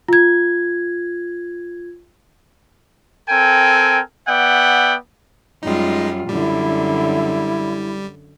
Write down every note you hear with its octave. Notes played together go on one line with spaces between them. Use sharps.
F4 G#6
C4 A4 A#4 G5 G#5
B3 D5 E5 F#5 G5
F#2 G3 G#3 D#4 F4
F#2 D3 G3 E4